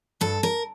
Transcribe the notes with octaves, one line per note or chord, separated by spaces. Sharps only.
G2 A4
A#4